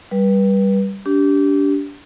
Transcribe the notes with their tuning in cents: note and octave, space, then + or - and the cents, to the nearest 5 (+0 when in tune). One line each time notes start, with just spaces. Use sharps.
G3 +0 B4 -30
D4 -30 G4 -15